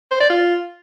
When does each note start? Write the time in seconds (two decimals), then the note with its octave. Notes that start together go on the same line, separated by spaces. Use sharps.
0.11 C5
0.20 D5
0.30 F4